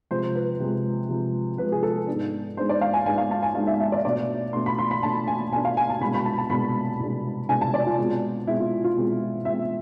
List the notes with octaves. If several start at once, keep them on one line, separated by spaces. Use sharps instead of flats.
C3 F3 G#3 C5
B4
C3 F3 G#3
C3 F3 G#3
C3 F3 G#3 B4
G#4
A4
G#2 G#3 B3 D4
G#2 G#3 B3 D4 C5
D5
F5
G#5
G#2 G#3 B3 D4 G#5
F5
A5
G#5
G#2 G#3 B3 D4 F5
E5
E5
D5
B2 A3 D4 D5
B2 A3 D4 C6
B5
C6
B5
B2 A3 D4 A5
G#5
B2 A3 D4 G#5
F5
G#5
A5
C2 B2 G#3 D4 B5
B5
A5
A5
C2 B2 G#3 D4 B5
C2 B2 G#3 D4
C2 B2 G#3 D4 G#5
A5
D5
F4
B2 G#3 C4
B2 G#3 C4 E4
F4
F4
B2 G#3 C4
B2 G#3 C4 E5